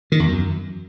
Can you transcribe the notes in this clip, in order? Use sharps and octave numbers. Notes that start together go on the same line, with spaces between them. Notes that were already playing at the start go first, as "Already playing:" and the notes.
D#3
E2
F#2